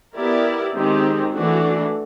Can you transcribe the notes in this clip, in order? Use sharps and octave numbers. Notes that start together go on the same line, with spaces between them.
B3 E4 G4 A#4 D5
D#3 G#3 C4 D#4 G4
E3 A3 D4 F#4